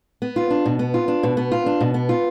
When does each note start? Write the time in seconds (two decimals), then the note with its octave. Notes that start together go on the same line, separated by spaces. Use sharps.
0.22 B3
0.36 F4
0.50 D4
0.66 B2
0.79 B3
0.94 F4
1.08 D4
1.23 B2
1.37 B3
1.52 F4
1.66 D4
1.81 B2
1.94 B3
2.09 F4